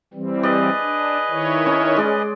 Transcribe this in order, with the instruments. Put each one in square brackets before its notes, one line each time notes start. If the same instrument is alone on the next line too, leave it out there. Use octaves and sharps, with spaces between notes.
[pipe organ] E3 G3 C4
[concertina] G#4 B4 D#5 [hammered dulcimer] D5
[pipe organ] D4
D#3 E4 C#5
[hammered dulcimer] C#4
G#3 D5